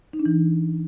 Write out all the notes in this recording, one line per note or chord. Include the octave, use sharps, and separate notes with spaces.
D#4
D4
E3